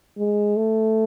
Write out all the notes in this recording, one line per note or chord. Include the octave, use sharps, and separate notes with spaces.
G#3
A3